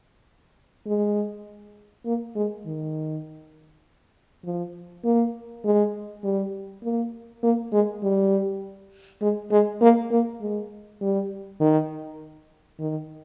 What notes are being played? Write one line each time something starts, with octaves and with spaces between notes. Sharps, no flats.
G#3
A#3
G#3
D#3
F3
A#3
G#3
G3
A#3
A#3
G#3
G3
G#3
G#3
A#3
A#3
G#3
G3
D#3
D#3